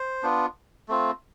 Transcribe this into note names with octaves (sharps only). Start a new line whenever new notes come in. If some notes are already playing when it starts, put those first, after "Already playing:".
Already playing: C5
B3 D4 F4
A3 C4 F4